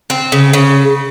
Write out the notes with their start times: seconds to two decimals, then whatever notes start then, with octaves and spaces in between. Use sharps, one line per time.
0.10 C4
0.32 C#3
0.53 C#3